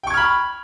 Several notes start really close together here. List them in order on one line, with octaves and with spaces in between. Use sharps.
G5 C#6 G#6 F6 B5